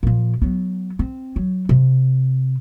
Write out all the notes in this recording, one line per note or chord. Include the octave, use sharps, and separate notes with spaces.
A#2 F3
F#3 B3
C4
F#3
C3